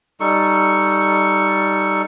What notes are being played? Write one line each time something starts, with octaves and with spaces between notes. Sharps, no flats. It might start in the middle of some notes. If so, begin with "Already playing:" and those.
G3 D#4 A4 C#6